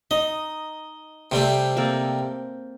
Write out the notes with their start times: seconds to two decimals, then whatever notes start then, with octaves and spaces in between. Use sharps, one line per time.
0.11 D#4 D#5
1.32 C3 G3 A3 C5
1.77 A#3 C4 A4